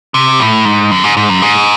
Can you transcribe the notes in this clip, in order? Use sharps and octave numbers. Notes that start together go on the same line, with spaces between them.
C3
A2
G#2
F#2
G#2
G#2
F#2
G#2